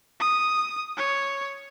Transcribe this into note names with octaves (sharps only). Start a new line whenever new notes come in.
D#6
C#5